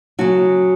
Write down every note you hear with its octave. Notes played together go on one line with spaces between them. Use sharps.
C#3 F#3 F#4